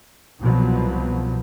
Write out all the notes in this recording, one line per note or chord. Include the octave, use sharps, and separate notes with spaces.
C2 B2 F3 F#3